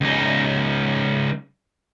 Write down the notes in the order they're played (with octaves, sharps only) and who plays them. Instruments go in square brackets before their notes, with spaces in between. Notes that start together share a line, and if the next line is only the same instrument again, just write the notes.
[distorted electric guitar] C#2 D#4